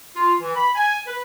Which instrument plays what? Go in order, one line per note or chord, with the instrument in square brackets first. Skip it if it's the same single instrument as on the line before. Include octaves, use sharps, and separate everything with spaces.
[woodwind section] F4
E3
B5
G#5
B4